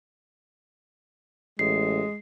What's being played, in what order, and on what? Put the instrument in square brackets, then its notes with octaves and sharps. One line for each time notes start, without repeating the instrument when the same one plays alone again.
[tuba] A1 [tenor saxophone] G#3 [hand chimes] C7